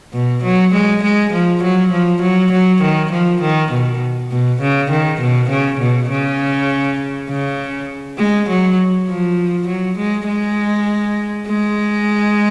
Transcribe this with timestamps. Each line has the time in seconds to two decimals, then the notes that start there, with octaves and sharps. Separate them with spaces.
0.13 B2
0.43 F#3
0.74 G#3
1.03 G#3
1.33 F3
1.63 F#3
1.92 F3
2.22 F#3
2.52 F#3
2.82 D#3
3.12 F3
3.42 D#3
3.72 B2
4.31 B2
4.61 C#3
4.91 D#3
5.21 B2
5.50 C#3
5.81 B2
6.10 C#3
7.30 C#3
8.18 G#3
8.49 F#3
9.09 F3
9.68 F#3
9.97 G#3
10.27 G#3
11.47 G#3